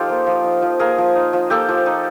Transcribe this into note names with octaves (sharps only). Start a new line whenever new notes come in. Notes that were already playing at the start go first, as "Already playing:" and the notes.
Already playing: F3 D#4 F4 G4 A4
A#3
F3
D#4
F3
A#3 G#4 A#4
F3
D#4
F3
A#3 G4 A4
F3
D#4